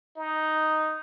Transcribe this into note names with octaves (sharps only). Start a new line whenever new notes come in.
D#4